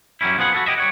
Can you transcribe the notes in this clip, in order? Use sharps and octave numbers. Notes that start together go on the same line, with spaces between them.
F#2 F#3 G3 C#4 E4
F3 B3 F4 G#4 F#5
F#4 A4 B4
E4 G4 D#5 E5
G3 C#5 F#5